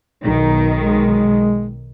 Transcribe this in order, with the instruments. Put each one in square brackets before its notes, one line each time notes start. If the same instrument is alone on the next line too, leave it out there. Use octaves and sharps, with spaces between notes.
[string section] B1 D#3 [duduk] D#4
[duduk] G#3